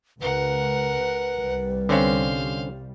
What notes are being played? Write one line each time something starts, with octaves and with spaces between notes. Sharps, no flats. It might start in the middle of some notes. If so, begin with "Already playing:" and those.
C#2 C#3 A#4 B4 F#5
C2 G3
D3 C4 C#4 C5 F5